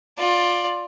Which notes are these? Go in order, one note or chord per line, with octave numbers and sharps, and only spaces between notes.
F4 D5